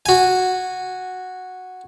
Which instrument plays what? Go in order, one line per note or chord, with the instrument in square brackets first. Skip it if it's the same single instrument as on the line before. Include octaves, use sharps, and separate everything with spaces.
[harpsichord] F#4 G#5